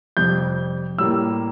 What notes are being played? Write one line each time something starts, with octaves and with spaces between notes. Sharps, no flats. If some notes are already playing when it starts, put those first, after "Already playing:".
F2 C3 G3 G6
A2 G3 A#3 E6